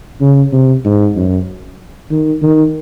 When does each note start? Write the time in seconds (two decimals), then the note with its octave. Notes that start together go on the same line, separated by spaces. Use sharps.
0.21 C#3
0.53 C3
0.85 G#2
1.16 F#2
2.11 D#3
2.43 D#3